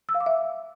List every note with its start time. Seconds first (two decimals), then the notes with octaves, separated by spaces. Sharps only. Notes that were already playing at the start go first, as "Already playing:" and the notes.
0.09 E6
0.15 F5
0.20 D6
0.26 E5